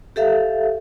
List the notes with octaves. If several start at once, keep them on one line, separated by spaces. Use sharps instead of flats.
G4 A4 E5 F5